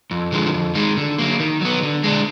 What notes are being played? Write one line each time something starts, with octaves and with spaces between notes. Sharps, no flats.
F2
D3 F3 G#3
F2
D#3 G#3
D3
F#3 A#3
D#3
F#3 B3
D3
G#3 D4